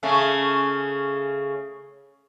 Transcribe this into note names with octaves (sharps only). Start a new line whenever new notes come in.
C#3 A3 C#4